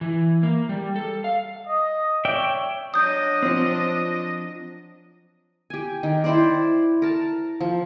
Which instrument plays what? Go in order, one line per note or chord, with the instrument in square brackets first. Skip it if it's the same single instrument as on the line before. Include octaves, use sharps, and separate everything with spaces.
[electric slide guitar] E3
A#3
G3
A4
F5
[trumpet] D#5
[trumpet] C#5 [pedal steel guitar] D5 E5 G5
[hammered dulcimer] F#3 [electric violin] D4 D#5 [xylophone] D#6 G6
[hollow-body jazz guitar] F3 C4
[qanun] G4 G#5
D#3
E4 C5 D5
A#4 A5
F3